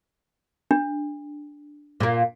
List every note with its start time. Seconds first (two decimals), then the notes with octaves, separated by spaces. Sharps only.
0.71 D4
2.00 A#2 A#3